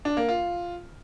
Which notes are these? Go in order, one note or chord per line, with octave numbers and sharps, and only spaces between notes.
D4
A#3
F4